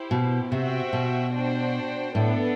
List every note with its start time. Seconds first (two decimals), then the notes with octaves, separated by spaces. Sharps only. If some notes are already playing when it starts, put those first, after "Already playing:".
Already playing: E4 G4 C5
0.11 B2
0.51 C3 F#4 C5 E5 G5
0.93 B2
1.33 D4 F#4 C5 G5
2.15 A2 B3 D4 A4